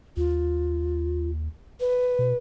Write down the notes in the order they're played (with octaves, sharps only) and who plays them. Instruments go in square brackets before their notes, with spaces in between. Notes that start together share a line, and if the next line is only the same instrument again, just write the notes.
[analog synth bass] D#2 [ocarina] F4
[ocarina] B4
[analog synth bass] B2